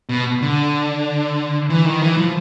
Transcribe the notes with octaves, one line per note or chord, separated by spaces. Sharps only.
B2
D3
E3
D#3
E3
F3